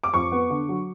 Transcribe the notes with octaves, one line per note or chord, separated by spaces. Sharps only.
D6
F2 C#6
B3
D3
F#3